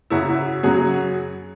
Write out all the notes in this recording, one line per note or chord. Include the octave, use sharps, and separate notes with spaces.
F#2 C#3 F#3 E4 F#4
E4 F#4
F#2 C#3 F#3 F#4 G#4